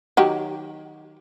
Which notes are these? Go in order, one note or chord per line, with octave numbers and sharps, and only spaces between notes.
D#3 F#3 G4